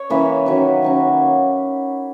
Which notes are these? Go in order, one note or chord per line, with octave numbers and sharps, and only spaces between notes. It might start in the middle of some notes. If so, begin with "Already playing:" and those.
Already playing: C#5
E3 A#3 C#4 B4
D#3 F#3 C#4
D#3 F#3 C#4